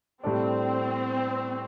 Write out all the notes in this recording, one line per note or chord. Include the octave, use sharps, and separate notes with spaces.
A2 G3 C4 D4 A4 D5